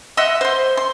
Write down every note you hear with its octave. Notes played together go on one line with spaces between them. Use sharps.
D#5 E5 F#5 C6
C5 C6
C6